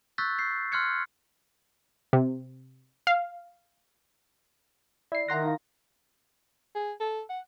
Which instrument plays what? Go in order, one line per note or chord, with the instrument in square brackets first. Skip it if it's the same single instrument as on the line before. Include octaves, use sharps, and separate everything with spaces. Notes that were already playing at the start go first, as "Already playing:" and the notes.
[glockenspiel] C#6 E6 F#6 G6 A6 B6
G6 C7
C6 F6 F#6 G#6 C#7
[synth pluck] C3
F5
[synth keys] E4 C7 [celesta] D5
[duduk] D#3 [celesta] E5 F#5 F#6 [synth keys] A#5 C6 A#6
[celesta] D#4 F5
[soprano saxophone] G#4
A4
F#5